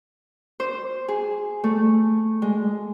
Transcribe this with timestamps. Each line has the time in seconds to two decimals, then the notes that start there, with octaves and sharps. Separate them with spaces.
0.60 C5
1.08 G#4
1.64 A3
2.42 G#3